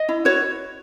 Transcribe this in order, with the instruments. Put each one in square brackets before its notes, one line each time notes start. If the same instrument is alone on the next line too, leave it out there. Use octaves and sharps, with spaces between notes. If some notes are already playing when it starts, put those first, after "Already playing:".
Already playing: [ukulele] D#5
E4
F#4 C#5